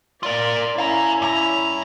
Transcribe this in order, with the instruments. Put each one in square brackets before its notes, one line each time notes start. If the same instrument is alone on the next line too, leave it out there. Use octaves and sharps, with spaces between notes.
[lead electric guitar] F4 A#4 [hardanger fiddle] D5
[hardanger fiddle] C#4 E4 [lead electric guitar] F5 A#5
[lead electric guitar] G2 A#5